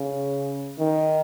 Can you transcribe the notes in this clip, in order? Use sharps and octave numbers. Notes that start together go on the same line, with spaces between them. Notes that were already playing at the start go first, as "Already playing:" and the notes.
Already playing: C#3
D#3